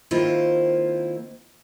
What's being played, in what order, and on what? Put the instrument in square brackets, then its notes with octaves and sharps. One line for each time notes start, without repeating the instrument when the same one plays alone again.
[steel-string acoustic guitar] D#3 A#3 C4 E4 F4 C5